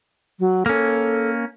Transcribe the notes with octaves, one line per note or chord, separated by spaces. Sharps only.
F#3
A#3 C#4 A4